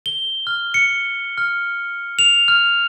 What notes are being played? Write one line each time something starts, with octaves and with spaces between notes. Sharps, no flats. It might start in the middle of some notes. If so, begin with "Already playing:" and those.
G7
F6
C#7
F6
F7
F6